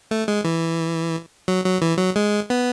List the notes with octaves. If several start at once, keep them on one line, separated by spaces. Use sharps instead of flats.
A3
G#3
E3
F#3
F#3
E3
F#3
G#3
B3